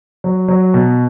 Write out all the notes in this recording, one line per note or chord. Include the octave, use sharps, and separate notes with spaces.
F#3
F#3
B2